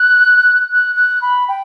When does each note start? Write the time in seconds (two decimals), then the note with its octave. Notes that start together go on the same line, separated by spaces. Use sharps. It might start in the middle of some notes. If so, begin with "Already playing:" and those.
Already playing: F#6
0.71 F#6
0.96 F#6
1.22 B5
1.49 G5